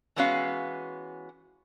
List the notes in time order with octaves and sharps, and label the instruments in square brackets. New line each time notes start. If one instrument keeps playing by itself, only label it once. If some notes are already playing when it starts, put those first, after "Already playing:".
[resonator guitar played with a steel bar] E3 G#3 B3 C#4 F#4 F5